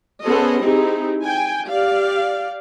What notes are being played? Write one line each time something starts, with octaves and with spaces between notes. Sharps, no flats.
B3 C#4 G#4 A4 C5 D#5
C4 D#4 E4 G4 G#4
G5 G#5
G4 D5 F5